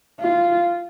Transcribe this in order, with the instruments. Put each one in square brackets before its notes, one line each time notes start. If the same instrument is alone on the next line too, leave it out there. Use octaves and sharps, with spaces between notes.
[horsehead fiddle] F4